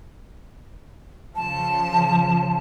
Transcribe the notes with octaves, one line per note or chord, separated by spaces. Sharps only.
C#3 F3 A5